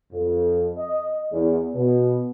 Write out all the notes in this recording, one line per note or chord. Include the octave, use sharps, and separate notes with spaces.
F2
D#5
E2
B2